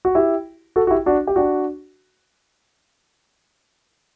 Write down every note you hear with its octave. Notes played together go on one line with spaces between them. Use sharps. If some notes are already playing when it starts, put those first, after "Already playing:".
F#4
E4 G4
F#4 A4
F#4
E4 G4
D4 F#4
G4
D4 F#4